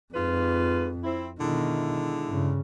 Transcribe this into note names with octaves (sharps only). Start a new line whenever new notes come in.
F2 G#2 F4 B4
C4 E4
B2 D3 D#3 G#3 E4
G2 C#3